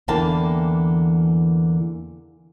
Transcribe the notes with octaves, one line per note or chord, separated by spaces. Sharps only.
E2 D3 E3 A#3 G5 A5